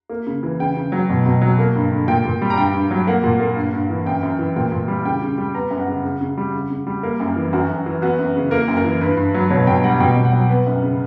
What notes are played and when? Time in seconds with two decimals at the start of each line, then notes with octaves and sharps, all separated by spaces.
0.10 A#3
0.27 C#3
0.43 E3
0.60 C#3 G5
0.77 C#3
0.92 F#3
1.09 B2
1.25 B2
1.42 F#3
1.59 A#3
1.75 G2
1.91 D3
2.08 A#2 G5
2.25 A#2
2.42 G3
2.50 A#5
2.58 G2 G5
2.74 G2
2.91 F#3
3.07 A#3 F#5
3.24 A#2
3.40 A#3
3.56 G2
3.73 G2
3.89 E3
4.06 F#2 G5
4.23 F#2
4.39 E3
4.56 A#2 G5
4.72 A#2
4.88 G3
5.05 C#3 G5
5.22 C#3
5.38 G3
5.54 B3 A#5
5.71 F#2
5.80 F#5
5.88 C#3
6.04 C#3
6.21 C#3
6.37 G3
6.53 C#3
6.70 C#3
6.87 G3
7.03 A#3 A#4
7.20 F#2
7.36 E3
7.53 F#2 F#4
7.69 F#2
7.86 E3
8.02 B3 F#4
8.19 F#2
8.36 C#3
8.51 A#3 A#4
8.68 F#2
8.77 A#4
8.84 E3
9.01 G2 B4
9.17 G2
9.34 F#3
9.50 B2 C#5
9.67 B2 G5
9.84 G3 F#5
10.00 B2 G5
10.16 B2
10.25 F#5
10.33 F#3
10.49 B3
10.66 F#2
10.82 C#3